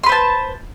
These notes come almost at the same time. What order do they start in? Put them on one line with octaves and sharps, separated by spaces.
C6 B4 C5 A5